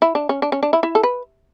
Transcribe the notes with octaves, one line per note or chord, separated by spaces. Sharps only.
E4
D4
C#4
D4
C#4
D4
E4
E4
A4
B4